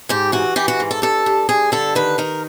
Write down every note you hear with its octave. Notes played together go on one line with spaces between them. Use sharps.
G#2 G4
E3 F#4
E3 G4
F#4
G#2
A4
G2 A4
G2
G2 G#4
D3 A4
D#3 B4
D#3 A#4